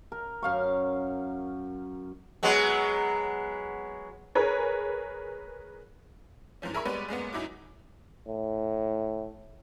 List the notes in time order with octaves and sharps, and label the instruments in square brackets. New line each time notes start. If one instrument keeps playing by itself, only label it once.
[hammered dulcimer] A#4
F#2 F5 C#6
[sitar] F#3 G#3 B3
[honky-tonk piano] G#4 A#4 B4 C#5
G#2 E3 F3 C#4
G#4 A#4 E5 B5 C#6
G3 G#3 B3 B4 C#5 D5
F#2 G#3 A#3 B3
F#2 D#4 E4 F#4 D6
[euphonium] A2